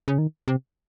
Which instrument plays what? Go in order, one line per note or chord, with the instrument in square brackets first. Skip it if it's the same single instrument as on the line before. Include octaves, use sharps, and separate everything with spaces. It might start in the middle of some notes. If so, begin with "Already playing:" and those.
[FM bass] C#3
D#3
C3